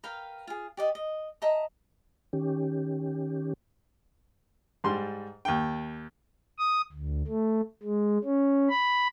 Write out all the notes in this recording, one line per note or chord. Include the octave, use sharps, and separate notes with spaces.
A#4 B4 F5 G5
F4 G#4
G4 D5 D#5
D#5
D#5 E5 A5 A#5
D#3 C#4 G4
G#2 G3 C6
D#2 G5
D#6
D2
A3
G#3
C#4
B5